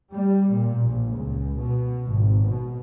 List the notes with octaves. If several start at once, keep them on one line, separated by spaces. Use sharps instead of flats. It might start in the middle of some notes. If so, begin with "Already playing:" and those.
G3
A#2
A#1
C#2
B2
G#1
B2